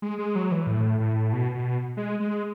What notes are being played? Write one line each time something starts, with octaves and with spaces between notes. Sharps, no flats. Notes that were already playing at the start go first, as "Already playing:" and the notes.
G#3
G#3
F#3
E3
A2
A2
B2
B2
G#3
G#3